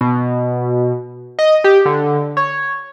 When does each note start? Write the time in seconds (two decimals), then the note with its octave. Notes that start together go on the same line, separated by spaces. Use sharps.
0.01 B2
1.39 D#5
1.64 G4
1.85 D3
2.37 C#5